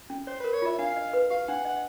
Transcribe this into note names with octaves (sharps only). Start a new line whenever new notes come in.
C#4
C5 C#5
A#4 B4
C#5
F4 E5
D4 F5
D#5
B4
G4 F5
D4 F#5
D#5 F#5